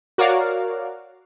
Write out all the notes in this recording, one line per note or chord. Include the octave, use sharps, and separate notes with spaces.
F#4 A#4 C#5 D5 F5